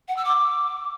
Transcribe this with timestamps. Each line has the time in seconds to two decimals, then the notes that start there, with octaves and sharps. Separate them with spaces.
0.08 F#5
0.17 E6
0.25 D6